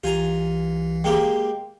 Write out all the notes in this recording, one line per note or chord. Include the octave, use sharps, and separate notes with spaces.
C2 E3 F4 G4 G#5 A#5
G#3 A#3 G4 G5